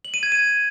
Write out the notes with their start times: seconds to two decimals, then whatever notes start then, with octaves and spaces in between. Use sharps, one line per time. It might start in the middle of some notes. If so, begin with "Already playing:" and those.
0.05 F#7
0.14 D#7
0.23 G#6
0.32 D#7